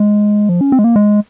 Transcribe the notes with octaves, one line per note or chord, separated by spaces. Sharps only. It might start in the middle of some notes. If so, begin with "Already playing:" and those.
Already playing: G#3
F3
C#4
C4
G#3
A#3
G#3